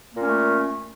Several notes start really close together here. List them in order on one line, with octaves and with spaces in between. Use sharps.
A#3 A#2 C#4 A3